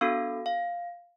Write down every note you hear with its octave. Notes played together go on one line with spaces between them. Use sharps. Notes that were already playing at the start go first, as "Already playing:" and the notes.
B3 D4 F#4 A4 F5
F5